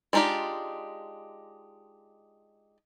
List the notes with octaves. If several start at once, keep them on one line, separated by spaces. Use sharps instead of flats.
G#3 D4 D#4 F4 G4